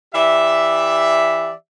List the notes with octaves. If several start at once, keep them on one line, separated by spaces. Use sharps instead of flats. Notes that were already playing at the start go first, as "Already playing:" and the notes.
E3 G4 D5 E5